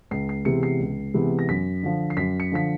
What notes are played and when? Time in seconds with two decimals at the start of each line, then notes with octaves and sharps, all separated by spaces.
0.11 C#2 C7
0.29 C7
0.45 C3 E3 G#3 B3 C#7
0.63 C7
0.80 C#2
1.14 C3 E3 G#3 B3
1.39 A#6
1.49 F#2 B6
1.83 D3 F3
2.10 C7
2.17 F#2 B6
2.40 C#7
2.52 D3 F3 B6